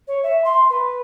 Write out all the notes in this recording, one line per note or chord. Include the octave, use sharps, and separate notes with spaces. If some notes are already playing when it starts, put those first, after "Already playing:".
C#5
E5
C6
B4